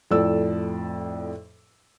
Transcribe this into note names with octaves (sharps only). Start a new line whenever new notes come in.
F2 A2 A4 D5 E6